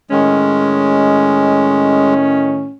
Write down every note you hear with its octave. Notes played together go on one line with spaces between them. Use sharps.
A2 D#3 G#3 C#4